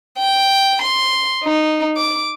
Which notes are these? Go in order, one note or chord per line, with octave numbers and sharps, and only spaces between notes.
G5
C6
D#4
D6